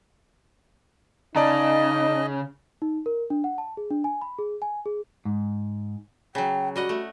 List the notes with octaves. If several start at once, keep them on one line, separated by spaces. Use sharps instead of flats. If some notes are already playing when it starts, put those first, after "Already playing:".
C#3 D#4 D5 D#5 A5 A#5
D#4
A#4
D4
F#5
A5
G#4
D4
G#5
B5
G#4
G#5
G#4
G#2
C#3 F#3 G5
G3 F#4 D#5 F#5
A3